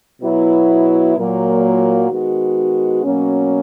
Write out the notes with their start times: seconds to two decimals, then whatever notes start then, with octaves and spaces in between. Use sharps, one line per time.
0.21 B2 F#3 B3 E4
1.15 A#2 F#3 A#3
2.10 D#3 G#3 B3 F#4
3.04 B2 F#3 A#3 C#4